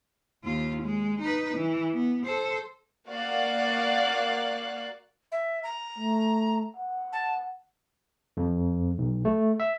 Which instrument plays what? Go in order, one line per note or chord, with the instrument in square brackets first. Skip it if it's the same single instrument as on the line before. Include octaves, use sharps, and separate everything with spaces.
[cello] D#2 F4
G#3
D#4 B4
E3
B3
A4 C5
[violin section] A#3 F#4 D5 F5 F#5 F#6
[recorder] E5
A#5
[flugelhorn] A3
F#5
[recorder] A5
[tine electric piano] F2
B1
A3
E5